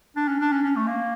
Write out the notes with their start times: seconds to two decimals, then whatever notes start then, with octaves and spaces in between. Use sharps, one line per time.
0.16 D4
0.28 C#4
0.40 D4
0.52 C#4
0.64 C#4
0.76 A3
0.87 A#3